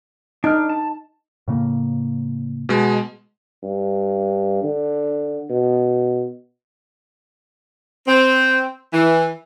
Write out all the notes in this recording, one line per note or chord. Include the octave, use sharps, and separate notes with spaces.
D4 D#4 F6
A5
A2 C#3 A#3
B2 G#3
G2
D3
B2
C4
E3